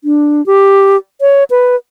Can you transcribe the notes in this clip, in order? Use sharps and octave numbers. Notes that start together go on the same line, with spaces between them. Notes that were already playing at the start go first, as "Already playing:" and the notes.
D4
G4
C#5
B4